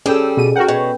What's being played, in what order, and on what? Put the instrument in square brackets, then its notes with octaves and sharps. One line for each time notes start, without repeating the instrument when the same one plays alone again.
[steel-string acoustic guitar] G3 [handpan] C#4 A4 [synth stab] G#4 G5 E6
[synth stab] B2 D#7 [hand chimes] G#4
[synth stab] F#4 A#4 F#5 [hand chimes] G5 G6
[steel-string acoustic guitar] B2 [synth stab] C#5